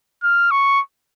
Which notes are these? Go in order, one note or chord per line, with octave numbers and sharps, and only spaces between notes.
F6
C#6